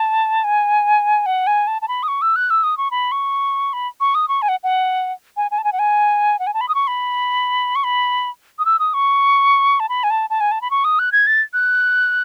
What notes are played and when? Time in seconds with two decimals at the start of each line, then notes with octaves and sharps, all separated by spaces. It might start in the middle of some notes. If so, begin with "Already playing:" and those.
Already playing: A5
0.44 G#5
1.26 F#5
1.47 G#5
1.67 A5
1.82 A5
1.88 B5
2.03 D#6
2.08 C#6
2.22 E6
2.36 F#6
2.50 E6
2.63 D#6
2.78 C#6
2.91 B5
3.12 C#6
3.73 B5
4.00 C#6
4.15 D#6
4.28 C#6
4.42 G#5
4.49 F#5
4.63 F#5
5.37 G#5
5.51 G#5
5.58 A5
5.64 G#5
5.73 F#5
5.79 G#5
6.39 F#5
6.47 G#5
6.54 A5
6.61 B5
6.69 D#6
6.75 C#6
6.87 B5
7.76 C#6
7.84 B5
8.59 D#6
8.65 E6
8.79 D#6
8.94 C#6
9.80 A5
9.89 B5
10.04 G#5
10.10 A5
10.30 A5
10.40 G#5
10.51 A5
10.62 B5
10.71 C#6
10.84 D#6
10.99 F#6
11.12 G#6
11.27 A6
11.53 F#6